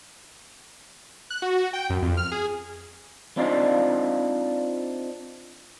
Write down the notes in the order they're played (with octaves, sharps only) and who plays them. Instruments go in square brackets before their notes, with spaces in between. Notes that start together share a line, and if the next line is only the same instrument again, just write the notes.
[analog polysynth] F#6
F#4
F#4
G5
F#2
F2
F6
G#4
[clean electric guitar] C4 D4 D#4 F4 D5